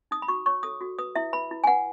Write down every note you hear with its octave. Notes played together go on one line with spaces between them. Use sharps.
D#4 D#6
B5
F#4 C#6
C#5 C#6
A4 D#6
F#4
B4 D#6
E4 E5
B4 B5
E4
G#5
B4 F#5